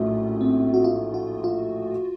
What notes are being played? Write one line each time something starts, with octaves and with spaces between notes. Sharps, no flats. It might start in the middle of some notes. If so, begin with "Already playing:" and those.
Already playing: A#1 A2 F#3 C#4 F4
C4
F#4
F4
F#4
F4